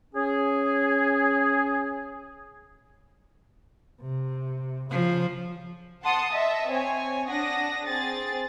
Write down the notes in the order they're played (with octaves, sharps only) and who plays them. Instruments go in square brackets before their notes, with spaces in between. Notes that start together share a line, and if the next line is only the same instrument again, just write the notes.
[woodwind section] C#4 G#4
[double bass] C3
[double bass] C#3 [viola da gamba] F3
[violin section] F#5 A5 C6 D#6 C#7
D#5 E5 A5
C4 C#5 G#5
D4 F#5 D#6 A#6
C4 G#4 A6